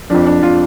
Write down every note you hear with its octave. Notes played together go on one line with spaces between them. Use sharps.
F2 F3 D4
D4
F3 F4